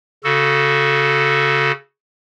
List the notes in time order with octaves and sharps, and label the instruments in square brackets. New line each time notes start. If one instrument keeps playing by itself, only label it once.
[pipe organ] C#3 F#4 A4